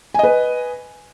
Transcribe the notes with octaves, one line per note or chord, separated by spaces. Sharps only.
B4 D#5 G#5